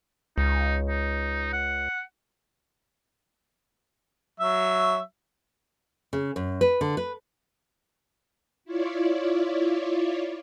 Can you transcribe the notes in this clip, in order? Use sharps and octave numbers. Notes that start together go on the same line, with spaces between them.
C#2 D#4
D#4
F#5
F#3 E5
C#3
F#2
B4
D3
B4
E4 F4 C#5 D5